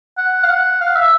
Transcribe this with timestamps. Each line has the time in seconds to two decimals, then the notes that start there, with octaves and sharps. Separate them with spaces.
0.18 F#5
0.43 F5
0.49 F#5
0.81 F5
0.96 E5